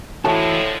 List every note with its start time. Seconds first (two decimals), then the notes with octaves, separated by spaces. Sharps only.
0.25 A2 D3 E3 F3 G#3 E4 F#4 A5